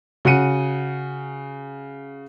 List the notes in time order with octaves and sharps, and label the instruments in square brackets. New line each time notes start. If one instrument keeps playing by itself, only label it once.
[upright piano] C#3 F#4 F#5 C#7 D#7